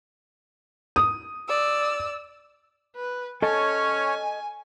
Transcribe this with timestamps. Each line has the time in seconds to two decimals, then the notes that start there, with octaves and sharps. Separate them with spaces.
0.96 D#6
1.48 D5 E6
2.96 B4
3.42 C#4 A4 C#5 D#5 G#5 A5